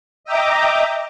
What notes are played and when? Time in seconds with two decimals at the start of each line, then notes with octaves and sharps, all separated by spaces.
0.24 D#5 E5 G5 A#5 D6